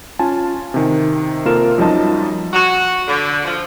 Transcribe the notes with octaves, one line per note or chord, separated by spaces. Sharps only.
C#4 F4 G#5 A5
C3 D#3
C3 A#3 F4 A4 A#4 E7
F#2 F3 G3 D#4 D#5 A5
F#4
D3
F3